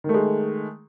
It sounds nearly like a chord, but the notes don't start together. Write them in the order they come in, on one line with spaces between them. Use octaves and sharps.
D#3 A3 G#3